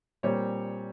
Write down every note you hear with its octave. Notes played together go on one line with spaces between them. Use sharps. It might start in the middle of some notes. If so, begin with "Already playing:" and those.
A#2 G3 C4 C#5